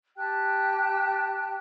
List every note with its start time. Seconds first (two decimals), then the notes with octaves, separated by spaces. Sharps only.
0.17 G4 G5 A5 F#6